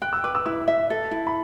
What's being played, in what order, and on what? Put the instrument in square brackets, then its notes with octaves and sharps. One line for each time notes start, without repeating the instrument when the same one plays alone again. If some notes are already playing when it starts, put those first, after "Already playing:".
[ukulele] G5 [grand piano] F#6
[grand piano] E6
[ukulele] B4 [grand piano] D6
[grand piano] E6
[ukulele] E4 [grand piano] E6
[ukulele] E5
A4
E4
[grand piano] B5